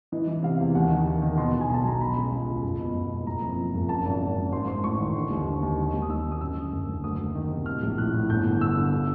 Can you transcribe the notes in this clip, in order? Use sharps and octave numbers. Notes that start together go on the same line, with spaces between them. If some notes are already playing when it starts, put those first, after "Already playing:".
E3 D#5
E3
C3 F5
E2
D#2 F#5
D#3
D#3
D#3
B2 C6
B2
G#5
B1 A5
B1 A#5
B2 B5
C#2
C#2
C#2
F#1
B2
F#1
F#1
F#1 A#5
F2
F2
F#1
C#3 A5
G#1
G#1
F#2
G#2 C6
G#2 C6
A1 C#6
D#3
D3
D#2
D3
D#2
D#3
D#2
D#6
D#2 E6
D#3
D#6
F#2 E6
D3
F#1
F#1
D2 D#6
D2
D#3
C3
A2 F6
A#1
A2 F#6
A2
G1 G6
D3
G1 E6
D3
D3